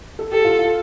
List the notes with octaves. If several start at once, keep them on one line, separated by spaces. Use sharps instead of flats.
A4
G4 A4
F4
F4